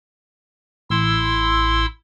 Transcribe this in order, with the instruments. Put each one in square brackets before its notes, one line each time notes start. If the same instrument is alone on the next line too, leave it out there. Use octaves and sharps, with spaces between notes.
[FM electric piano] A1 [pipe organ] E4 C6 E6